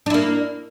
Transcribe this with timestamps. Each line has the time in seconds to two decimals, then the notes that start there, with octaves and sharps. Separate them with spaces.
0.06 D4
0.10 E4
0.14 A#3